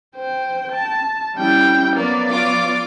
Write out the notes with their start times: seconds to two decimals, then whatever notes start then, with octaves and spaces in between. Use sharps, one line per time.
0.17 C5 G5
0.72 A5
1.35 G3 C#4 E4 G5
1.96 F#3 A#3 B3 D5
2.30 F4 D6